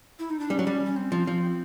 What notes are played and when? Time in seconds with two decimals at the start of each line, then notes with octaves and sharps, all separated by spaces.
0.19 E4
0.30 D#4
0.40 D4
0.50 G3 C#4
0.59 F#3
0.67 G3
0.86 C#4
0.96 C4
1.12 F3
1.27 F3